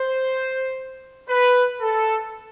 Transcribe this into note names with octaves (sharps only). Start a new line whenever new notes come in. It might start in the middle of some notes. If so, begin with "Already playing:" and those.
Already playing: C5
B4
A4